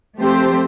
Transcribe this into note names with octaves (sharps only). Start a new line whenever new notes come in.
F3 A3 C4 G4 C5